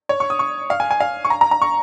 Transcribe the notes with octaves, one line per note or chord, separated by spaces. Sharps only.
C#5
C#6
D#6
C#6
F5
G#5
G#5
F5
C#6
A#5
A#5
A#5
C#6